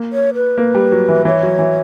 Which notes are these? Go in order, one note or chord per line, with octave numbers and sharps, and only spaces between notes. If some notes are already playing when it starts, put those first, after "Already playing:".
Already playing: A#3
C#5
B4
A#3
G3
F#3
E3
E3 C#5
F#3
E3